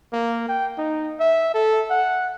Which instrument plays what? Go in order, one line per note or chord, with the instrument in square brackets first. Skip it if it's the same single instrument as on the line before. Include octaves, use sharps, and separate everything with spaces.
[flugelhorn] A#3
G5
D#4
E5
A4
F#5